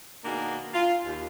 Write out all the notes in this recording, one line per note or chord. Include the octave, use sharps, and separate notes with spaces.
B2 D#3 A#3 D4 F#4 G#4
F4
D#2